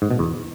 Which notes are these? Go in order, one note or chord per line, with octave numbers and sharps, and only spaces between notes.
G#2
B2
E2